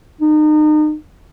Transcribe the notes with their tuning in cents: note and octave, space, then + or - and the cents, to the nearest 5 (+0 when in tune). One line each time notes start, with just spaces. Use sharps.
D#4 -35